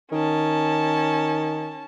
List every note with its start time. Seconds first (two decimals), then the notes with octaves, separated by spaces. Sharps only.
0.12 D#3 C#4 A5